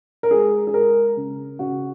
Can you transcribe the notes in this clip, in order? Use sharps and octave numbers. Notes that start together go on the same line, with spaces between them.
A#4
G#3 G#4
G#4
G#3 A#4
C#3
C#3 F#4